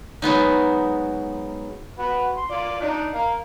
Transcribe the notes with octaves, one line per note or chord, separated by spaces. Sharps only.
F#3 G#3 B3 D#4
F#4 B4
C6
F4 D5
D4 D#4
A#4 F5